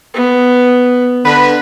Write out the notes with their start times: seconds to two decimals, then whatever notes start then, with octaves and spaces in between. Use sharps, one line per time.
0.14 B3
1.25 D3 B4